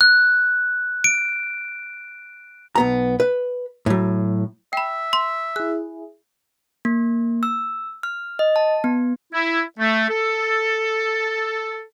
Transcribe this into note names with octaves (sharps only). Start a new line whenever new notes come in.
F#6
D7
B1 B3 A#5
B4
A2 F#3
E5 G5 B5
C6
E4 G#4 F#6
A#3
E6
F6
D#5
A5
B3
E4
A3
A4